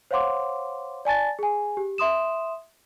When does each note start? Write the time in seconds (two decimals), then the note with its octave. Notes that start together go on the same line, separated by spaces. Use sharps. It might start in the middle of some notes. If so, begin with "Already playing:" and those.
0.11 C5 C#5 F5 F#5 C6 D6
1.05 D5 G#5 A5 A6
1.39 G#4 G#5
1.77 G4
1.98 E5 C6 D#6 E7